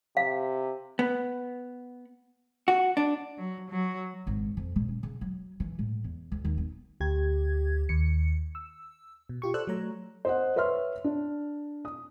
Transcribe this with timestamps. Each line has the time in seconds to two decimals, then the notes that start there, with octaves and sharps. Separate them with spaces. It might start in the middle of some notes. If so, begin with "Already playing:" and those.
0.17 C3 F5
0.99 B3
2.68 F#4
2.97 D4
3.38 F#3
3.70 F#3
4.27 G#1
4.57 F2
4.76 A#2
4.89 C#4
5.03 C#3
5.21 F#3
5.60 E3
5.79 A2
6.04 E2
6.32 D2
6.45 D#2
6.58 B3
7.00 D2 G4 G#6
7.89 D#2 C#7
8.55 E6
9.29 B2
9.42 F4 G4 C#6
9.54 A4 C5 D5 E6 F#6
9.67 F#3 A3 C#5 A#5
10.25 C5 D#5 F#5
10.56 B4 C#5 E5 C6 F6
11.04 D4
11.85 D#6